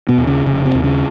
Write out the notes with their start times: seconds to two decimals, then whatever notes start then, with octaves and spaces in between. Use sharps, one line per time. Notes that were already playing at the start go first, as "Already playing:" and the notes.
0.08 B2 B3
0.18 D#2
0.27 C#3 C#4
0.46 F1 C#3 C#4
0.65 C3 C4
0.75 D#2
0.84 C#3 C#4